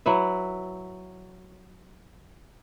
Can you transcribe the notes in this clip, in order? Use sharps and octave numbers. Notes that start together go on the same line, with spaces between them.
F#3 E4 B4 E5